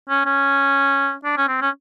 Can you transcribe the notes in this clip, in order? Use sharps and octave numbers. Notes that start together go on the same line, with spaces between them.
C#4
C#4
D4
C#4
C4
C#4